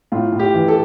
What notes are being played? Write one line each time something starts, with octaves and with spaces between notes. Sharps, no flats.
A2 F4
A2
G4
E3
A4